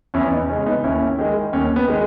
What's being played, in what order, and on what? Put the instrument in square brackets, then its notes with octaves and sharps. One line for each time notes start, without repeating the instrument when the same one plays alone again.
[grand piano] E2 C#4 E4
B3 D#4
C#3 C#4
G#3
B3 D#4
D#2 C#4 E4
D#3 G#3
D#2 C#4
B3
D#3 G#3